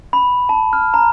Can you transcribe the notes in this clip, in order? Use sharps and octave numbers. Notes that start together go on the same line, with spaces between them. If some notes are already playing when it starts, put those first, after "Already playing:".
B5
A5
F6
A#5